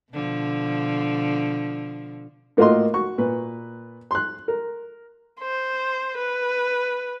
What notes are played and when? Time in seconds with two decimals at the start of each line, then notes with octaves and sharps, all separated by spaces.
0.12 B2 D3 F3
2.57 A2 A#3 F4 F#4 D#5 C6
2.94 F#4 C#6
3.18 A#2 B4
4.11 C6 F#6
4.48 A#4
5.41 C5
6.18 B4